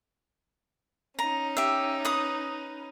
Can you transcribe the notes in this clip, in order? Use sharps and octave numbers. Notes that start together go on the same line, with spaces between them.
C#4 D#4 A#5
G4 E5
B4 D#6